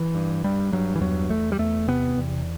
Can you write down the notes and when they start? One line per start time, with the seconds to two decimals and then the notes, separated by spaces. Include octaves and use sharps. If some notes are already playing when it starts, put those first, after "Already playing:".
Already playing: E3
0.15 G2
0.44 G2 G3
0.73 G2 F#3
0.95 E3
1.01 E2 F#3
1.30 E2 A3
1.52 G3
1.59 E2 A3
1.88 C3 B3
2.17 E2